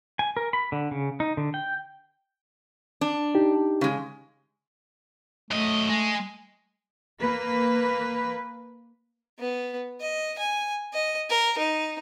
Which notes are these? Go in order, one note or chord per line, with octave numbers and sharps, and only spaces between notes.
G#5
A#4
B5
D3
C#3
D#4
D3
G5
D4
D#4 G4
C#3 G#3
F#2 A3 D#5
G#3
A#3 B4
B3
D#5
G#5
D#5
A#4
D#4